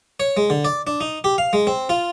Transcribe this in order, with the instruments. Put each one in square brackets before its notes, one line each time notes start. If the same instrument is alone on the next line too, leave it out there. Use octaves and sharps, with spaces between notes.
[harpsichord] C#5
G#3
D3
D5
D4
D#4
G4
F5
G#3
C4
F4